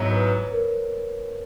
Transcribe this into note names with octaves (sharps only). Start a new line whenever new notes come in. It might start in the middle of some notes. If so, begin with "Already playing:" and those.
Already playing: G#2 F#3 B3 E4 C#5
B4
A#4